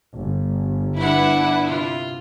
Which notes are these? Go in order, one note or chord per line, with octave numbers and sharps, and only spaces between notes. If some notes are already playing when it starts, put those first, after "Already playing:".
G1
D4 E4 B4 F#5 B5
C3 F4